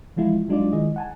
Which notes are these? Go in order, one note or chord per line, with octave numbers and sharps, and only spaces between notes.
E3 F3 G#3 E4 F4
F#3 G#3 D4 D#4 F4 D5
D#3 G#3 E4 G#4 D#5
F#5 G#5 A5